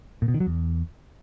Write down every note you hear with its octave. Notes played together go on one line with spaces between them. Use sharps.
A#2
B2
D#3
F#3
E2